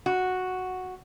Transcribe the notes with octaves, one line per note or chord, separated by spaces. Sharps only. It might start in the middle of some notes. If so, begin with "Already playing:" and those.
F#4